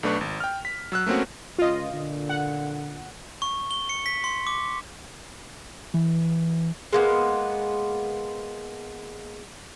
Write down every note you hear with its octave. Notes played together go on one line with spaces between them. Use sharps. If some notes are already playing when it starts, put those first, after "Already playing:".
B1 A3 D4 B4 C#6
G#1
G5 F6
B6
F#3 E6 F#6
A3 A#3 C4 C#4 F#4
C#2 F4 D#5
A#2 D3
F#5
C#6
G7
C#7
B6
C6
D6
E3
G#3 A#3 B3